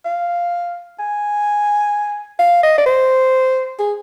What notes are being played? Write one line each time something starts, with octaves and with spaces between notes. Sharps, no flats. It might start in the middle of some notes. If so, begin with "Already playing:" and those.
F5
G#5
F5
D#5
D5
C5
G#4